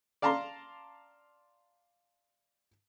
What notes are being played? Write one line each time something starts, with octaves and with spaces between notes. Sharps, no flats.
D5 F5 A5 A#5 C6